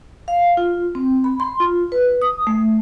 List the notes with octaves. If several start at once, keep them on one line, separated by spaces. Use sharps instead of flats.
F5
F4
C4
B5
C6
F4
B4
D#6
A3